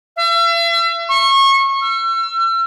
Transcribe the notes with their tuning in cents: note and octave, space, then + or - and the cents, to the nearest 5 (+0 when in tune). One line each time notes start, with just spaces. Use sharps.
E5 +40
C#6 -30
E6 +40